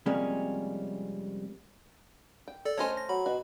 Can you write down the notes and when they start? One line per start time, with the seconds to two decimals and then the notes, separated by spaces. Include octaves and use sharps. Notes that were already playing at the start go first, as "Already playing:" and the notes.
0.06 C3 F3 G3 G#3 A#3 C#4
2.48 G5
2.65 A4 D5
2.78 A3 C#4 C5 C#5 D#5 G#5
2.97 A#6
3.09 F#3 B5
3.26 B2 F#4